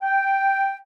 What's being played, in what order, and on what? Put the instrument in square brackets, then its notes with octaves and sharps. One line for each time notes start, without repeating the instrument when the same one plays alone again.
[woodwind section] G5